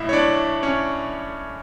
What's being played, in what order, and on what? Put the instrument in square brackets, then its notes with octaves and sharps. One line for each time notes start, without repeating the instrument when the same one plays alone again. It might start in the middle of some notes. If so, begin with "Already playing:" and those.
Already playing: [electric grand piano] B1 A2 E4 E5
C#5
D4 D5
C#4 C#5